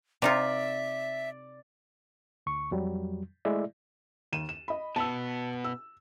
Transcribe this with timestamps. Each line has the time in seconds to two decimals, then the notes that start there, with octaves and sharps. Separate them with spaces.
0.22 C3 D#4 F4 D5 E5
2.46 D2 C#6
2.71 F2 F#3 G3
3.45 G#3 A3 E4 D5 E5
4.32 D#2 D#7 E7
4.49 E7
4.68 D#5 B5
4.96 B2 B3 A5 E6
5.64 E6